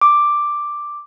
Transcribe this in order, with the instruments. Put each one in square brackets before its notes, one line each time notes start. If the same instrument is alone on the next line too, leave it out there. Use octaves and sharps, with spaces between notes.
[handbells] D6